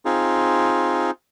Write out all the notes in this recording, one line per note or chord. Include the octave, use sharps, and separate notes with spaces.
C4 D#4 F4 G#4